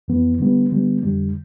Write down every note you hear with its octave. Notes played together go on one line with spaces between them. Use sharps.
F2 E3 B3
D3 G3 B3
D3 G3 B3
F2 D3 G3